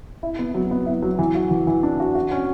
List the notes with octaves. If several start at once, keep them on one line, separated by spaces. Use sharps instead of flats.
E4
B3
F#3
B3
E4
F#3
E3
F#4
E3
E3
D4
F#4
F#4
C#4